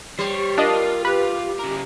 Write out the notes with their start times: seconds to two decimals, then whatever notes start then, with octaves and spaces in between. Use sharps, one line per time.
0.19 G3 C5 C#5
0.58 D4 F4 A#4 D#5
1.05 G4 B4
1.59 C#3 A#4